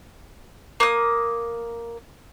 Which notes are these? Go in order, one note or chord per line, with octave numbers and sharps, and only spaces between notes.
A#3 D#6